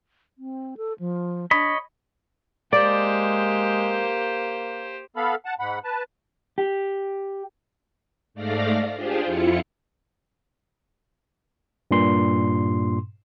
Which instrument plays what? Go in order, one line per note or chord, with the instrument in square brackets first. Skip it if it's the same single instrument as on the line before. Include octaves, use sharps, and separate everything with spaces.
[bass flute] C4
A4
F3
[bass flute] D4 [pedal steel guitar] C#5 D#5 B5
[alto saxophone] G#3 [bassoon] A#3 [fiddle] G4 C5 [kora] D5
[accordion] B3 A4 F5 B5
F#5 A5
G#2 F#5 B5
B4 A5
[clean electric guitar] G4
[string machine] G#2 A3 D5 F5 A#6
D4 F4 G4 G#4 C5
F2 E4 F4 C#7
[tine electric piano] G2 A#2 C6